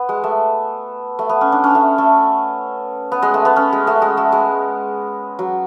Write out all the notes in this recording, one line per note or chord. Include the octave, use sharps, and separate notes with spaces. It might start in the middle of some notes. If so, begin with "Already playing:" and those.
Already playing: B3
G#3
A3
A3
B3
C#4
D4
C#4
A3
A3
B3
G#3
A3
B3
C#4
G#3
A3
G#3
A3
G#3
F#3